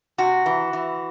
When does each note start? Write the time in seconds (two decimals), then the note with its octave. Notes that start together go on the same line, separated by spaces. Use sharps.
0.18 C3 F#4
0.46 E3
0.73 E3